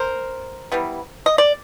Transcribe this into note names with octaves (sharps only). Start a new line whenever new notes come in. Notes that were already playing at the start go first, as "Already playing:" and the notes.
Already playing: A#4 C5
E3 G3 B3
D#5
D5